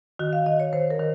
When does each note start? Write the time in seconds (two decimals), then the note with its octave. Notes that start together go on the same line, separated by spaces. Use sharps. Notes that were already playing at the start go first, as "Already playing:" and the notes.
0.19 D#3 F#4
0.33 F5
0.46 D#3 D#5
0.60 C#5
0.73 D#3 C5
0.90 A#4
0.99 D#3